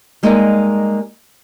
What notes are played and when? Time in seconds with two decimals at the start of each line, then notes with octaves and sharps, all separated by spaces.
0.23 G3 G#3 A#3 D#4 G#4 D#5